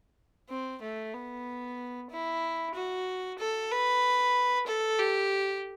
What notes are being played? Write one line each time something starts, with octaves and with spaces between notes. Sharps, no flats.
C4
A3
B3
E4
F#4
A4
B4
A4
G4